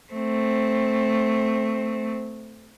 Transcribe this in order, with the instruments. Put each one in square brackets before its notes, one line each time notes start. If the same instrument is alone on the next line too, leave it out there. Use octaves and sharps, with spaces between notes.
[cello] A3 C4